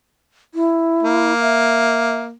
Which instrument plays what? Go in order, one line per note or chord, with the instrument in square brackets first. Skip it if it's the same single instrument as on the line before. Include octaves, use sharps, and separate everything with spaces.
[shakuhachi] E4
[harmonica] A#3
[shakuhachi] E5